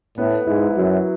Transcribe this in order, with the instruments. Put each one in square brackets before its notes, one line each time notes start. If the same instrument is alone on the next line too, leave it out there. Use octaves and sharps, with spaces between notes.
[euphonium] A2 [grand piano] B3
[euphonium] G#2 [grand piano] E4
[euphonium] F#2 [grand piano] F#3